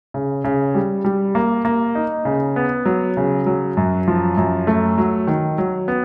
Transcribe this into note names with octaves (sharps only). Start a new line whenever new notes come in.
C#3
C#3
G3
G3
A#3
A#3
D#4
C#3
B3
F#3
C#3
F#3
F#2
F3
F#2
A3
F#3
D#3
F#3
B3